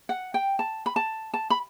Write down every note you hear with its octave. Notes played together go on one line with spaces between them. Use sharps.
F#5
G5
A5
B5
A5
A5
B5